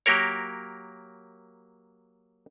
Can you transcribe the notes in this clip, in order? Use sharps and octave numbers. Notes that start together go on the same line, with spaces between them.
F#3 A#3 G4 A#4 C#5